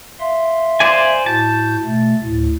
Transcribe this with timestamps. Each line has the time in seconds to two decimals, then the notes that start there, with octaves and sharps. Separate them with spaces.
0.20 E5 F5 C6
0.80 C5 D5 G#5
1.26 A2 F#4 A5 G6
1.84 B2 A3
2.23 D2 A2